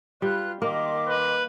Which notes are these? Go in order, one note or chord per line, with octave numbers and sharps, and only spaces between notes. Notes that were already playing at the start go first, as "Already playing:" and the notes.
G3 F4 B4 F#6
D#3 A#3 D#5 C6 D6
B4